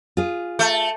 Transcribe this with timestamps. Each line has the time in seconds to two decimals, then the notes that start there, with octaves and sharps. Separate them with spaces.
0.17 F4 G#4
0.59 A3